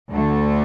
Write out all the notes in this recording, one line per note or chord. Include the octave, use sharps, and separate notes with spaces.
D2 D3 A3